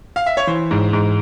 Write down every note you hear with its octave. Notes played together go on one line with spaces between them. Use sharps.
F5
E5
C#5
E3 C5
G#2
G#2